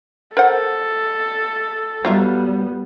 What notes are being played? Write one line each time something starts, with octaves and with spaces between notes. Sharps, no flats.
A4 A#4 C5 F#5
F#3 G3 B3 F4 E5